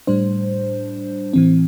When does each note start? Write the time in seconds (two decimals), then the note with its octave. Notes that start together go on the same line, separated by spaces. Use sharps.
0.07 A2 G3 D4 C5
1.33 A2 E3 C4